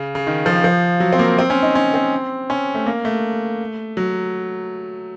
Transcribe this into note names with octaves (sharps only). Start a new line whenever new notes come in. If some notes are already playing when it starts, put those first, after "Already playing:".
Already playing: C#3
C#3
D#3
F3
F3
F#3
C4
A#3
C4
C#4
D#4
C#4
C4
C#4
A3
A#3
A3
F#3